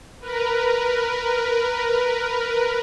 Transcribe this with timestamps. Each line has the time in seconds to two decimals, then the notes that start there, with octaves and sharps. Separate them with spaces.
0.20 A#4 B4